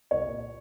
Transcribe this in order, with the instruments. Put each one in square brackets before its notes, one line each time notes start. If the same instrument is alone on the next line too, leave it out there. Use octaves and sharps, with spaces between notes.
[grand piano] C2 C#5
A#2